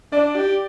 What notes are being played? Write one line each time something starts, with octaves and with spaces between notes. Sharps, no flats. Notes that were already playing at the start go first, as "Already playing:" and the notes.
D4 D5
G4